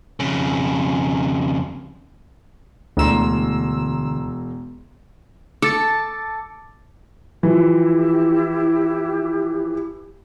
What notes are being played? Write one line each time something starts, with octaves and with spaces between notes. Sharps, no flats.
F2 C#3
E1 D2 A#5 C6 E6
A4 D6 A6 C#7
E3 F3 E4 G4